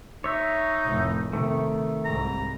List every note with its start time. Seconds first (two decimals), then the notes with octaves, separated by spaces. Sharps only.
0.24 D#4 C#5 E5
0.85 F1 A2
1.33 C3 D#3 A3
2.05 C2 G#2 A#5